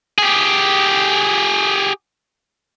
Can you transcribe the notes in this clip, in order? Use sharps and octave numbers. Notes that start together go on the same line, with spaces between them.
G4 G#4